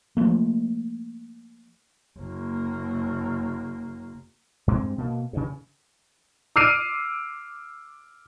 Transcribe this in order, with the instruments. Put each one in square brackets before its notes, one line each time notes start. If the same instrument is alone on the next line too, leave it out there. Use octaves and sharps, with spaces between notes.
[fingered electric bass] F3 F#3 A3 A#3
[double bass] F#1 A#3
[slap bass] G2 G#3 C4
B2 A#3
G2 C#3
[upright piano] D6 E6 F6 C7 D7 D#7